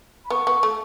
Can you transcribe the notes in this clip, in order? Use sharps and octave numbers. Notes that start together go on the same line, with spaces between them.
B5
B3 C#6
B3
A3